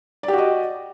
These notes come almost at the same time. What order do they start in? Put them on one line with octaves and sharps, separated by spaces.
D5 G4 F#4 D#5